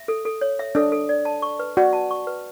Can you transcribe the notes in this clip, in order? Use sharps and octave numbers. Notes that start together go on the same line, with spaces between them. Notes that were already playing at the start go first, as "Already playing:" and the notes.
Already playing: E5
A4
A4
C#5
E5
D4 A4
A4
D5
A5
C#6
B4
F#4 D5
A5
C#6
B4